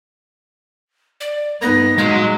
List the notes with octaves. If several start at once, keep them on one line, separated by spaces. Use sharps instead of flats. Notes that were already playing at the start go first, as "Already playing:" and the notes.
D5
G2 B3 D#4 A#6
A#2 F#3 G#3 F5